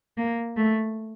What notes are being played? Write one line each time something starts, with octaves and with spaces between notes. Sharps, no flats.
A#3
A3